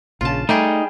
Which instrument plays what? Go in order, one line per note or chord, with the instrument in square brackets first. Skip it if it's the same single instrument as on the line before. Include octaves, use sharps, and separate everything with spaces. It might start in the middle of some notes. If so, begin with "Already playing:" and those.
[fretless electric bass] A#1 C#3 [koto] F4 A5
[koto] G3 G4 G#4 [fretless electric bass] A3 [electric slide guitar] D#4